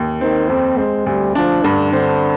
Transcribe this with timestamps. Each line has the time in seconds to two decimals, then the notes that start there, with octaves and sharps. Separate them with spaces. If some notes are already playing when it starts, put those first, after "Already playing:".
Already playing: D#2
0.21 D#3 C4
0.49 F2 C4
0.78 G#3 C4
1.06 D2 G3
1.35 F3 D4
1.63 G2 D3
1.92 D3 C4